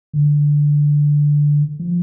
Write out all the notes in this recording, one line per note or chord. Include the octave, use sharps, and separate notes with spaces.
D3
F3